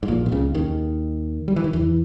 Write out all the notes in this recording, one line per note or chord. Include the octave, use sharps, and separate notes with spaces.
G#2
A#1 A#2
B2
C#2 C#3
D#2 D#3
G3
E3
D#3
E2 E3